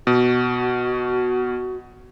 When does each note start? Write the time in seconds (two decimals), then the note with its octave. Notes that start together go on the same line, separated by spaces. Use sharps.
0.07 B2 F#4